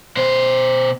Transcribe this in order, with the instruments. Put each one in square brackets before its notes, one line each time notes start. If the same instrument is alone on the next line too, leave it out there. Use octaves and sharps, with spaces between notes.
[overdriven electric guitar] B2 C5